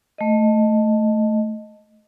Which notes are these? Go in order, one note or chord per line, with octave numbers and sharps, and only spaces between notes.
A3 D#5